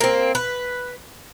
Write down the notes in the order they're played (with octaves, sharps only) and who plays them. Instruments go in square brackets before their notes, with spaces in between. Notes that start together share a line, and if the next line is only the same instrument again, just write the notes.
[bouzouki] A#3 C4
B4